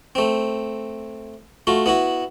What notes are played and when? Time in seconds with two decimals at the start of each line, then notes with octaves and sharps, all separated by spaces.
0.15 A3 C4
1.67 A3 F4 F#4
1.86 B3 E4 F#4